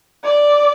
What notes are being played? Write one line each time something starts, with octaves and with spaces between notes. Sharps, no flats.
D5